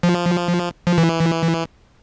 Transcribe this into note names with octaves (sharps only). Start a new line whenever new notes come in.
F3
F3
E3